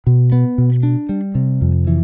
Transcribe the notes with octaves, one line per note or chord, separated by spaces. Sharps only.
B2
B3
B2
D4
G3
C3
F2
E3